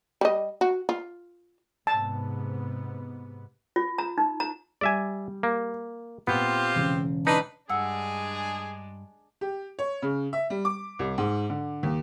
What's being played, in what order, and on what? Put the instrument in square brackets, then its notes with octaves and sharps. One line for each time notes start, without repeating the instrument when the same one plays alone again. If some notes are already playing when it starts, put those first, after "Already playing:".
[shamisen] G3 D#5
F#4
F4
[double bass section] G#2 C3 B3 [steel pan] A5
[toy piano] F4
A#5
D#4
A#5
[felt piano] G3 [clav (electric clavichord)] D5 E5 G#5
[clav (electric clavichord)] A#3
[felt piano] A#2 [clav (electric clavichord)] B3 [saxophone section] C4 F4 G4
[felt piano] E1 C#3
[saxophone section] D4 B4 [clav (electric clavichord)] D#4
[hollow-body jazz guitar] G2 F#5 [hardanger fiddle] G#3 D4 [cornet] G#4 [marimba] E6
[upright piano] G4
C#5
C#3
E5
G3
D6
C2
G#2
D3
D#2